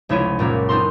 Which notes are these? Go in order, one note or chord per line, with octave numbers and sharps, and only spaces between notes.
F1 C#2 E4 C#5 D#7
F#2 A#2 A#3 C#4
B3 C4 D#4 A4 A#4 C6